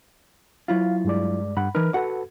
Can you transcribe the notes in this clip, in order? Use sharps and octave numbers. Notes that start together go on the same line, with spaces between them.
F#3 E4 F4 F5
G2 G#3 D5
G2 F#5 B5
E3 D#4 A#4 B4 F6
F#4 A4 B4 F#5